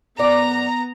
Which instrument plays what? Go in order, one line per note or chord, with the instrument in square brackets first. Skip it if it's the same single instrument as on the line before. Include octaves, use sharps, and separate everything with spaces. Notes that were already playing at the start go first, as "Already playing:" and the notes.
[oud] F#2 D5 [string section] B3 A#5